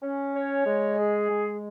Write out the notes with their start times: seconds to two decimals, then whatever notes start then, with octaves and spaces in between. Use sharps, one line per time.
0.02 C#4
0.35 C#5
0.66 G#3
0.98 G#4
1.29 G#3